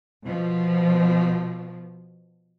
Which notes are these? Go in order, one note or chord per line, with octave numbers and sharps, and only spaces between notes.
B2 F3